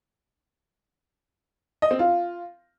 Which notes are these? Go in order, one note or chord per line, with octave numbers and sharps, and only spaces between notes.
D#5
C4
F4